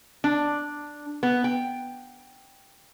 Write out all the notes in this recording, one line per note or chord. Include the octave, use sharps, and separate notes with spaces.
D4
B3
G5